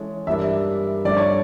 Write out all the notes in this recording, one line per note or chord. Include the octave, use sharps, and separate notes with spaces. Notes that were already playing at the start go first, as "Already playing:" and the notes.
Already playing: E3 G#3 C#4 E4 A4
G2 E3 G3 A#3 D4 E5
G2 D3 F3 A3 D5
C#5